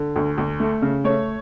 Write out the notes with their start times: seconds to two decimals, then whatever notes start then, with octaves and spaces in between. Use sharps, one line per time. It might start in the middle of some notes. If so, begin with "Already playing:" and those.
Already playing: D3
0.16 D2
0.38 D2
0.60 A3
0.82 C#3
1.04 A3 C#5